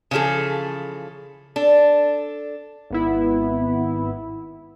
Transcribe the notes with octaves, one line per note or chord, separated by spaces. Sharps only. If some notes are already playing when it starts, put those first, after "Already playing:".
C#3 E3 F3 G#4 A4
D4 A4
G#1 B3 E4